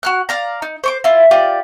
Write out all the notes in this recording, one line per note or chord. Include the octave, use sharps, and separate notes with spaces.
F#4 F6 F#6
D5 F5 A#5
D#4
C5 C#6 D6
E4 F4
F4 G4 D5